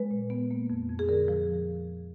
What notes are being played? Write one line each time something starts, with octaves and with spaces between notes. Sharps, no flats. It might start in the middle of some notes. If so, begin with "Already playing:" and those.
Already playing: G#3 B4
A#2
B3
A#3
F2
F2
G#4
D3 A#4
F3